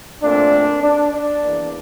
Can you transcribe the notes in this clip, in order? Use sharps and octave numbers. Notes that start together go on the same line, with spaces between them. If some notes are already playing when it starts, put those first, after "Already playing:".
A#2 A3 C4 D4
D4
D4
E2 E3 A#3